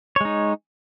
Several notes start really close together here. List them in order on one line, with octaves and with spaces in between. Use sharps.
C#5 G#3 D#4